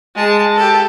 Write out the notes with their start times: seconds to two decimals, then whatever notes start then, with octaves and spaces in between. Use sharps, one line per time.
0.16 G#3 A5
0.56 G4 A4